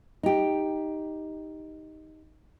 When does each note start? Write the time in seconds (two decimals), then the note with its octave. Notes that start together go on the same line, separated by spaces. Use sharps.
0.23 D#4 G4